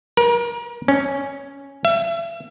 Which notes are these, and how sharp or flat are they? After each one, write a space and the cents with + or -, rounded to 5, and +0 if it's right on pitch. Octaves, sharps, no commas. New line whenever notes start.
A#4 +35
C#4 +0
E5 +35